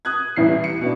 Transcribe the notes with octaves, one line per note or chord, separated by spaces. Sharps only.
D#6 F#6 G#6
A1 E2 G3 E4 C7
C#7
B2 D4